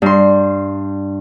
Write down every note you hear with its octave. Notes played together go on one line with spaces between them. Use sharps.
G2 C6